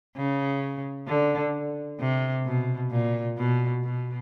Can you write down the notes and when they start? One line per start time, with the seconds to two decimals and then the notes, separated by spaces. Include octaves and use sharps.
0.16 C#3
1.08 D3
2.00 C3
2.46 B2
2.91 A#2
3.37 B2
3.83 B2